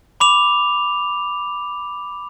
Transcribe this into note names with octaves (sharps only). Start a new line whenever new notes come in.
B5 D6 F7